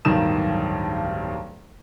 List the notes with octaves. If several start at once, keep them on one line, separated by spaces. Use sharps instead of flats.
D1 B1 G2 D#3 D#6 E7